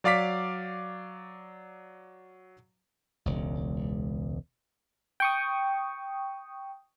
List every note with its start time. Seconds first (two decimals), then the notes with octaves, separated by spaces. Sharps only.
0.04 F#3 D5 F5 D6 B6
3.26 E1 C#2
5.20 G5 C#6 D#6